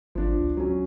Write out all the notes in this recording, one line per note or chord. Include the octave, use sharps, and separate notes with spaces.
G#1 F3 D4
C#2
F#3 C#4